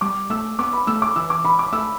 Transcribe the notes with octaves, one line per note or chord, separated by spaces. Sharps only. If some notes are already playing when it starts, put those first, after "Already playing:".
G3 D6
A3 E6
B3 D6
B5
A3 E6
D6
E3 E6
D6
B5
D6
A3 E6